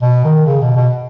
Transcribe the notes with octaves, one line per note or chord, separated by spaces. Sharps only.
B2
D#3
C#3
B2
B2